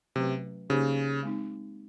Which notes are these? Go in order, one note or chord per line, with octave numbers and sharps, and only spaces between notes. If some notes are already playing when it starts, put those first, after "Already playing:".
C3 F#3 A3 C#4 F#4 B4
C#3 A#3 D#4 G4 C5
G#3 C4 D#4